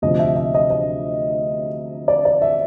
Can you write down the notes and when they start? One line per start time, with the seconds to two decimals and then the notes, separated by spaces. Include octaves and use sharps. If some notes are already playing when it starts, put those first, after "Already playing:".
0.02 D2 C3 F3 D#5
0.19 E5
0.36 E5
0.54 D#5
0.70 D#5
2.08 D5
2.25 D5
2.42 E5